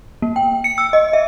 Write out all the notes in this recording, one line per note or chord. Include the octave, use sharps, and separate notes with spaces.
A#3
G5
C#7
E6
D#5
E5